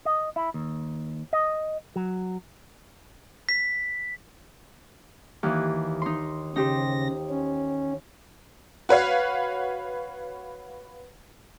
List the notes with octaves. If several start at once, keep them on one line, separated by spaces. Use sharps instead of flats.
D#5
E4
D#2
D#5
F#3
B6
D#2 E3
D#4 C6
C#3 D#4 G4 C5 A#6
C#4
F#4 B4 C#5 F5